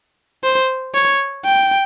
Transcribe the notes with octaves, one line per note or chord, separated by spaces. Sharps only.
C5
C#5
G5